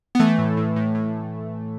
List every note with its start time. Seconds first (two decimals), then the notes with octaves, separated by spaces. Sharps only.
0.15 B3
0.19 E3 A3
0.38 A2
0.57 A2
0.76 A2
0.95 A2